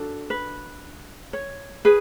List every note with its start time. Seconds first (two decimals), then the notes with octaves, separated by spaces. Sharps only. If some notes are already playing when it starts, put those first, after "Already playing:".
Already playing: D4 F#4 A4
0.30 B4
1.33 C#5
1.85 G#4 B4